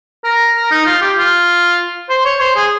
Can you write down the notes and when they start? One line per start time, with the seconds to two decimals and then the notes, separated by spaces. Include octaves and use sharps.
0.24 A#4
0.56 A#4
0.71 D#4
0.86 F4
1.01 G4
1.17 F4
2.09 C5
2.25 C#5
2.40 C5
2.56 G#4